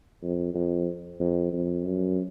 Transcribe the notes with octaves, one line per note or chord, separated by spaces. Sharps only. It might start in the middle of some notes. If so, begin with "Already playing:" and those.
F2
F2
F2
F2
F#2